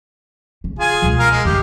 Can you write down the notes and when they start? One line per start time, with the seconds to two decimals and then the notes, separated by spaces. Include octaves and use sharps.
0.64 C#3
0.79 F4 G#4 G#5
1.02 C#2 B2
1.19 A#4 F5 F6
1.31 G#3
1.45 G2 D#3 G4